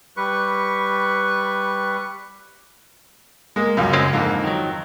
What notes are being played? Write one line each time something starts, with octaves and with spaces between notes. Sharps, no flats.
G3 B4 C#6
G#3 A#3
C#2 F#2
G#3 C4 C#4
F2 G#2 D3 A#3
D#3 F#3